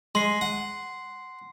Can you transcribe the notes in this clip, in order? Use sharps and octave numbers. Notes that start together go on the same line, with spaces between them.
G#3 C6 C7
F#5